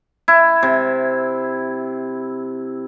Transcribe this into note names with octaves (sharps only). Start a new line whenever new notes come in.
E4
C3